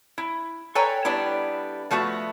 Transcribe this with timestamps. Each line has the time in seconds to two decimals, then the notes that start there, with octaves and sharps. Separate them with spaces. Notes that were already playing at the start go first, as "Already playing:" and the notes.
0.18 E4
0.75 A4 B4 C#5 G5 G#5 A#5
1.05 G3 B3 D4 E4
1.91 F3 A3 B3 F#4 E5